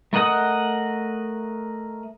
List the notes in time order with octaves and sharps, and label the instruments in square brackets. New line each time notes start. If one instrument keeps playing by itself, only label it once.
[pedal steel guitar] A3 A#4 D#5 F#5 D#6